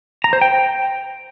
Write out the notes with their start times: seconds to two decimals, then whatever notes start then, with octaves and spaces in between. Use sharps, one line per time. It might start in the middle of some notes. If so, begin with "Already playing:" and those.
0.24 A#5
0.33 C5
0.41 G5